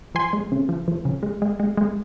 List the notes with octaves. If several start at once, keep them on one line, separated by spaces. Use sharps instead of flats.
F3 G#5 C6
G#3
C#3
F3
F3
C#3
G#3
G#3
G#3
G#3